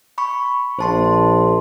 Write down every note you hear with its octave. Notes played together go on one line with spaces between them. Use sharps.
B5 C#6
A#1 C5 A5 C6